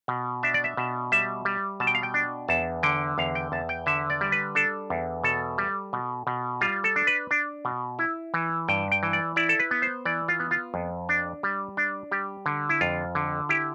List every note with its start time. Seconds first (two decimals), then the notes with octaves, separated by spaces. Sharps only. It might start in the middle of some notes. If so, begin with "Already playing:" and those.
0.08 B2
0.43 D4 E5
0.54 D5
0.64 E5
0.77 B2
1.12 G3 E5
1.45 G3
1.80 B2 A5
1.87 G5
1.95 F5
2.03 G5
2.14 D4
2.48 E2 A5
2.83 D3 G5
3.18 E2 F5
3.35 G5
3.52 E2 A5
3.69 G5
3.86 D3 E5
4.10 D5
4.21 G3
4.32 B4
4.55 D4 A4
4.90 E2
5.24 B2 A4
5.58 G3
5.93 B2
6.27 B2
6.61 G3 F4
6.84 A4
6.96 D4
7.07 B4
7.31 D4
7.65 B2
7.99 E4
8.34 E3
8.68 G2 G5
8.92 G5
9.03 E3
9.13 D5
9.36 E4 D5
9.49 A4
9.59 B4
9.71 B3
9.82 C5
10.05 E3 D5
10.28 F4
10.40 B3
10.51 F4
10.74 F2
11.09 D4
11.43 G3
11.77 D4
12.11 G3 G4
12.46 D3
12.69 E4
12.81 F2 F4
13.15 D3
13.49 E4 G4